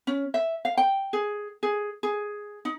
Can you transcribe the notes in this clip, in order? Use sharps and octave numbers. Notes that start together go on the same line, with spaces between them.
C#4
E5
F5
G5
G#4
G#4
G#4
D#4